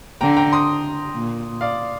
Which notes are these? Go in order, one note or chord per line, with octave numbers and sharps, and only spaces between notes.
D3 G5 A#5
G5 A#5
C6 D#6
A#2
D5 F5